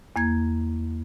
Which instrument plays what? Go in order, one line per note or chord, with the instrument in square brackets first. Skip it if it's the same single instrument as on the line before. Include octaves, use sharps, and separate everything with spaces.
[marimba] E2 A#3 G#6